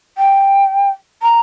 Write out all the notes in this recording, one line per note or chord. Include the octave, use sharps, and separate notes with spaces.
G5
A#5